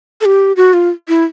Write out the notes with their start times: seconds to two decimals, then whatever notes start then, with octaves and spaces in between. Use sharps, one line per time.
0.21 A4
0.25 G4
0.57 F#4
0.73 F4
1.08 E4